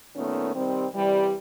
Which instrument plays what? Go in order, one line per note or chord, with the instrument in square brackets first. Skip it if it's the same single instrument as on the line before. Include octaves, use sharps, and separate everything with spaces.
[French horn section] A#2 D#3 A3 B3 C#4
C3 D#3 G3 C4
C3 E3 G3